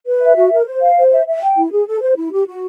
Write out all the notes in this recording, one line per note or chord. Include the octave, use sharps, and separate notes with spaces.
B4
E5
F#4
A#4
C5
F5
C5
E5
E5
G5
E4
G#4
A4
C5
E4
G4
F#4